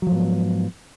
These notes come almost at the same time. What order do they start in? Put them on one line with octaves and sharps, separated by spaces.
F#3 F3 G#2 B3